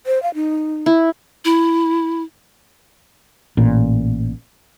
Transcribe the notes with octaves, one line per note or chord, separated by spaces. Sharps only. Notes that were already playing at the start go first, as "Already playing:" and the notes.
C5
F5
D#4
E4
E4
A1 A#2